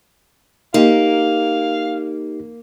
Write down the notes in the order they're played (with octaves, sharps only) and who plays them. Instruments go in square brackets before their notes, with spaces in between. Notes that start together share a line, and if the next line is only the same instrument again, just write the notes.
[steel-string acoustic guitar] A#3 [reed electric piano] D#4 G4 [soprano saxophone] F5